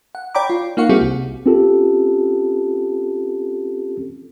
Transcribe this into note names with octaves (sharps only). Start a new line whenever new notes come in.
F#5
C#5 D5 G5 A#5 B5 D6
F4
A#3 D#4 F4 F5 F#5 C#6
G3 A#3 C4 E4 F#4 G#4
C2
C4 C#4 F4 G4 A4